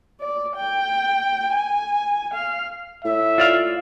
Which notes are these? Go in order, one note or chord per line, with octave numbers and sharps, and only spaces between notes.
D5
G5
G#5
F5
A2 E5
F4 D5 F5